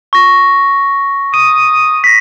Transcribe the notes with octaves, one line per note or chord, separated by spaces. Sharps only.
C#6 A#6
D#6 D#7
A#6 B6